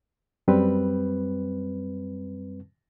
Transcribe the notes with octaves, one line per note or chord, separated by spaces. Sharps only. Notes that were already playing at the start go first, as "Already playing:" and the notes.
F#2 G3 C4 B4